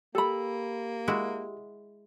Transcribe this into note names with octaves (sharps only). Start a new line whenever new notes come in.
A#3 G4 A4 B5
G#3 E4 F#4